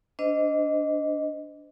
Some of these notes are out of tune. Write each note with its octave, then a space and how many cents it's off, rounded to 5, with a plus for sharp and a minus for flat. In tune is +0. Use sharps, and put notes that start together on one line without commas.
D4 -15 C5 -35 D#5 +0